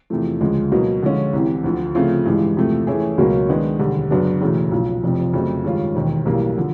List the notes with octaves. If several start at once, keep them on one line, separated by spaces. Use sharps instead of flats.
E2 C3 F3 A3
D2 C#3 F3 G#3
B2 F#3 A#3
D3 F3 G#3 C#4 F4
C2 C3 E3
D2 D3 F3
C#3 F3 A3 C4 F4
A1 G2 E3 G#3
E2 C3 F3 A3
E3 A3 C#4 E4 G#4
C#2 B2 F#3 A#3 C#4
D#3 G#3 B3 D4
E1 D#2 D3 G3
F#2 C#3 F#3 B3 D4
E1 E2 C#3 F#3 A3
B1 A#2 F3
F1 F2 C3 F3
F2 C#3 F#3 A3
G2 D#3 G#3 C#4 F4
E1 D#2 D#3
B1 A2 E3 G3 A#3
D3 F3